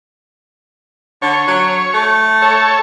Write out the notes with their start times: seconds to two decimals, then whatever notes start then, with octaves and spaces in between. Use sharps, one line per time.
1.22 D3 C#5
1.48 F#3
1.94 A3
2.42 A4 C#5